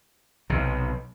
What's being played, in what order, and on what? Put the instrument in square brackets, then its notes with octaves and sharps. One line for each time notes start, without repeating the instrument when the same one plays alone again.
[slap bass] B1 C3